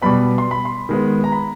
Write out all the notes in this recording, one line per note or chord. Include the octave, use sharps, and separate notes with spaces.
B2 G3 B3 B5
C6
B5
C6
D#3 G#3 B3
A#5
B5